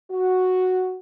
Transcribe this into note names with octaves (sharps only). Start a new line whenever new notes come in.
F#4